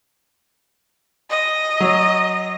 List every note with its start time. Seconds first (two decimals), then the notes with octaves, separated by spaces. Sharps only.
1.30 D#5
1.80 F#3